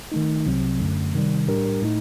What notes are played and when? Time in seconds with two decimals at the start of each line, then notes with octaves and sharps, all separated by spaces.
0.12 D#3 A3 D#4
0.46 C2 C3 F#3 C4
0.80 F#2 D3 A3
1.14 C3 D#3 G3
1.48 A2 G3 D4 G4 A#4
1.81 A2 A3 D#4